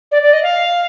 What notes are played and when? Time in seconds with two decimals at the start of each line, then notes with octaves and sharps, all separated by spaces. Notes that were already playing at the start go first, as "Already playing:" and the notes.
0.12 D5
0.22 D5
0.33 D#5
0.43 F5